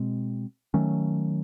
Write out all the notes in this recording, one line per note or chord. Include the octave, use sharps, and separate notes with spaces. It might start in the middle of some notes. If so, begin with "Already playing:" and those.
Already playing: B2 G#3 C4
D#3 F#3 A3 C#4